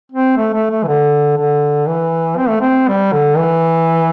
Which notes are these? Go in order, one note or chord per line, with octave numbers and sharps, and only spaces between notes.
C4
A3
A3
A3
E3
D3
D3
E3
C4
A3
C4
G3
D3
E3